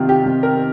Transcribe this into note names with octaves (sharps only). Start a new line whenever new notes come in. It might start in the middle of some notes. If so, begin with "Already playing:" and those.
Already playing: C3 D#3 F4
G4
C3
A#4